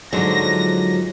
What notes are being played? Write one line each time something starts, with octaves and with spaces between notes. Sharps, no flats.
G#2 D3 F3 F#3 A#6